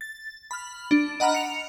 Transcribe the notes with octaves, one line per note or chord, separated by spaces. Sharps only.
A6
B5 F6
D4
D#5 F#5 A#5 B5 F6
C#7 F7